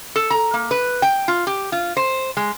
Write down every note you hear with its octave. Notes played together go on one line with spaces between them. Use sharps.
A4
A#5
A#3
B4
G5
F4
G4
F4
C5
G#3